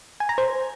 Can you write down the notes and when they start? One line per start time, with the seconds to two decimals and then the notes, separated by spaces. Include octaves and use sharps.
0.20 G#5
0.29 A#5
0.38 C5